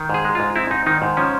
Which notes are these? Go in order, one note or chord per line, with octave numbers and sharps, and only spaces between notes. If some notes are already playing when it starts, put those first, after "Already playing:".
Already playing: D#3
G#2 G#4
G#3
G#2 F4
C4 E4
G#2 D#4
D#3 D#4
G#2
F3 C#4